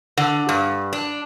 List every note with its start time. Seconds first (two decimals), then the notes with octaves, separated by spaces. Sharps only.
0.17 D3
0.49 G2
0.93 D4